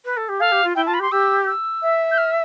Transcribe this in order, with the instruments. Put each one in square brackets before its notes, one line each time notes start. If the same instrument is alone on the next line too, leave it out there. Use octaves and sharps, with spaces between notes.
[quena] B4
A4
G4
[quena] A4 [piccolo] F5
[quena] G4
F4
[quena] E4 [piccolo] G5
[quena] F4 [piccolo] A5
[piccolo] B5
[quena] G4 [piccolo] C6
[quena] G4 [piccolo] E6
[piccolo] E6
[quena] E5
[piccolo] G6
F6